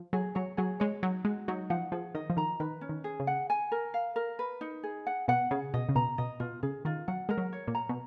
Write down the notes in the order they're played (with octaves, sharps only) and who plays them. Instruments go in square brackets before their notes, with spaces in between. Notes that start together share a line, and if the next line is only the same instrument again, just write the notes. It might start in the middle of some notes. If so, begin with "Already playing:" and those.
Already playing: [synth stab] F3
[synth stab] F#3 [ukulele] G#4
[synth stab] F#3 [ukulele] C#5
[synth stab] F#3 [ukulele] G#4
[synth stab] G#3 [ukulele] C#5
[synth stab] F#3 [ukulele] D#4
[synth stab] G#3 [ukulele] F#4
[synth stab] F#3 [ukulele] D#4
[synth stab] F3 [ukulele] F#5
[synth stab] F3 [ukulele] G#4
[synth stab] D#3 [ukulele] D#5
[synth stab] F3
[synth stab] D#3 [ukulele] A#5
[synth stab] D#3 [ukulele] B4
[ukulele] C#4
[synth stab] D#3
[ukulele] G#4
[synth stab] C#3
[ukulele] F#5
G#5
A#4
F5
A#4
B4
D#4
G#4
F#5
[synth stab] B2 [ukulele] F#5
[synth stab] C#3 [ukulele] G#4
[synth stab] B2 [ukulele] D#5
[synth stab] C#3
[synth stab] B2 [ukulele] A#5
[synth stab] B2 [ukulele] D#5
[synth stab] B2 [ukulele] F4
[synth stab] C#3 [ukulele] G#4
[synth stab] D#3 [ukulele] F4
[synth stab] F#3 [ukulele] F#5
[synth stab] G#3 [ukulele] A#4
[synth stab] F#3
[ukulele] C#5
[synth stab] A#2
[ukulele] A#5
[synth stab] B2